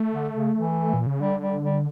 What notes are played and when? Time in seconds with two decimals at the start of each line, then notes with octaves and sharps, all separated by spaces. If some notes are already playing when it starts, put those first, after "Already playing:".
Already playing: A3
0.13 D3
0.35 C#3
0.56 E3
0.94 A#2
1.07 C#3
1.20 D3 G3
1.41 G3
1.63 G3